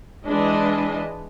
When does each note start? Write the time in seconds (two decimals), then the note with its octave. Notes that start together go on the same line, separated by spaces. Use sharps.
0.25 E3 G#3 D4 B4 D#5